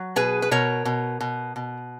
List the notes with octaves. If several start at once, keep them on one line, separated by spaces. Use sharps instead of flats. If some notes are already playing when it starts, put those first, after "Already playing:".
Already playing: F#3
B2 G#4 B4
B4
B2 A#4 C#5
B2
B2
B2